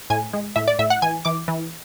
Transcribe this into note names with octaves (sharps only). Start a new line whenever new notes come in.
A2 G#5
G#3
A2 E5
D5
A2 E5
F#5
E3 G#5
E3 D6
E3